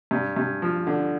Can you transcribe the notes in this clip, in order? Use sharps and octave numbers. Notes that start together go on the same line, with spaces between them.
G2
G2
F3
D3